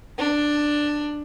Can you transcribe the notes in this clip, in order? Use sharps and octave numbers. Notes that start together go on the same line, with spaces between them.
D4